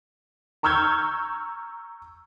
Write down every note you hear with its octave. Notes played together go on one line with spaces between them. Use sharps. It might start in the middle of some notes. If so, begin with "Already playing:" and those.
A#5 C#6 E6 F6 G6 G#6